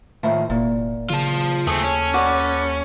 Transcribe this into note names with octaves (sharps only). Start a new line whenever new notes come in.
A2 D#3 F3
F1 A#2
C#3 F4 A5
D#2 A3 C4 G#4 A4
C#4
F#4 B4 D5